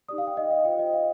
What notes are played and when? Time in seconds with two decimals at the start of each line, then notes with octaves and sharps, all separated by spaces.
0.08 D#4 G4 D5 D#6
0.18 F5
0.27 G5
0.37 D#5
0.51 F5
0.65 F4 C5 G5
0.79 D#5
0.93 F5